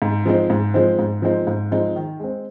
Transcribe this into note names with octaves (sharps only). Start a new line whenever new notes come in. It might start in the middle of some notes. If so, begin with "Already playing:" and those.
G#2
F3 G#3 C4 D#4
G#2
F3 G#3 C4 D#4
G#2
F3 G#3 C4 D#4
G#2
F3 G#3 C4 D#4
D#3
G#3 C4